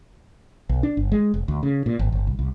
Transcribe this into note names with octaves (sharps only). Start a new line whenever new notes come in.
B1
D4
G1
G#3
F1
D2
C#3
A#2
G#1
G1
C2
C2